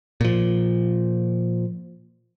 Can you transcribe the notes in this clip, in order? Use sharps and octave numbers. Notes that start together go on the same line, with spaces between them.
A#2 F3